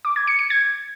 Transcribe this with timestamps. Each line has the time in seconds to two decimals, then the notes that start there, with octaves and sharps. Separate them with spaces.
0.05 D6
0.16 G#6
0.27 C#7
0.39 C#7
0.50 G#6